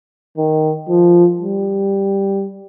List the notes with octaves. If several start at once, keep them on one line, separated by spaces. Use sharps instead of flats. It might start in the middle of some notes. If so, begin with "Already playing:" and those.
D#3
F3
G3